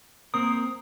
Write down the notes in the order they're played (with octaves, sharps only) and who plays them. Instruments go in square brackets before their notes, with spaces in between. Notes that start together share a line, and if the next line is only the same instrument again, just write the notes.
[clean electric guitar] A#3 C4 A#4 [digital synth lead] D#6